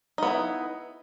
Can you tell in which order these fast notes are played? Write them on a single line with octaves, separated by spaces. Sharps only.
D#4 B3 E4